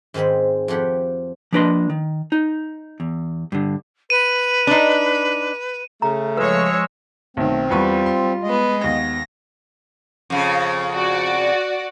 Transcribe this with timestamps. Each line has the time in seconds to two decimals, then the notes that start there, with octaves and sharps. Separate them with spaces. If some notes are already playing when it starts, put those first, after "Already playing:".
0.14 G#2 D#3 G#3 C4 B5
0.68 F2 F3 G4 F#5 B5
1.52 F3 A#3 D4 B4 D#5 C6
1.90 D#3
2.32 D#4
3.00 E2
3.52 G2 D3
4.10 B4 D#7
4.67 D4 D#4
6.02 C#3 A3 A#5
6.37 F3 G#3 B4 C#5 E6
7.37 B1 D#3 A3 C4
7.70 E2 G3 F4 B4 C#6
8.06 C6
8.44 G#3 B3 D#5
8.84 D#2 B3 A#6
10.30 F2 C#3
10.92 F#4 D5